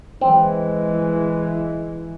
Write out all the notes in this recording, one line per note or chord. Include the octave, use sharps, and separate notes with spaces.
E3 G#3 C4